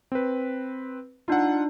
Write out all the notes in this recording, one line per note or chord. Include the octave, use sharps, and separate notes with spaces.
C4 B4
D4 D#4 F4 F#5